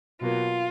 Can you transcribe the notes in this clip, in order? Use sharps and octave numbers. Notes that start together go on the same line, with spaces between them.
B2 F#3 A#3 F4